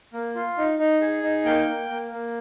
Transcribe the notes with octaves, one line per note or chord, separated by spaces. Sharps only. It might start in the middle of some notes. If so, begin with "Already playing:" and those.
A#3
F4
D#4
D#4
G#4
D#4
A#3 G5
A#3
A#3
A#3